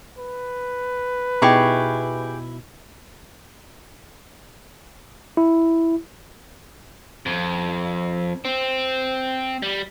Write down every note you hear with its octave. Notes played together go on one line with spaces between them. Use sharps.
B4
B2 D#4 E4 G4 G#4 C#6
E4
F2
C4
G3